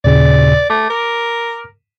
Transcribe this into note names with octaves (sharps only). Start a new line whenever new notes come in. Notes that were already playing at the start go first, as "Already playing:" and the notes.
D#2 A#2 C#3 D5
A3 D6
A#4